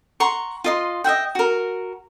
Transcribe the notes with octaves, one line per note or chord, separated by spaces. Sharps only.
F#5 A#5 C6 C#6
F4 D#5 C6
D#5 E5 F#5 G5
F#4 A#4